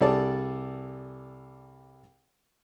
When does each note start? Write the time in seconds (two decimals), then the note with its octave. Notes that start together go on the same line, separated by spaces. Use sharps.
0.01 C2 G3 G#4 A4 D5 A5